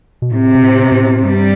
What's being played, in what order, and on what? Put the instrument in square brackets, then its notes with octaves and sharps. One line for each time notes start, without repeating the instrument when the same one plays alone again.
[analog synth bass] B2
[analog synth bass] A2 [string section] C3
[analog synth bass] B2
A2
B2
A2
[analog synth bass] G2 [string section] G3